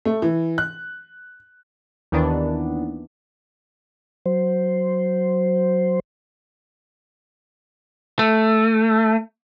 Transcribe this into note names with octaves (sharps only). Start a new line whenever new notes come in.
A3
E3
F#6
D#2 D#3 E3 B3 D4
F#3 C5
A3